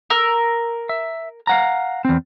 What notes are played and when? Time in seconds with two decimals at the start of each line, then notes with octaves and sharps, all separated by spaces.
0.10 A#4 E6
0.89 E5
1.47 F5 F#5 A#5
2.05 E2 C4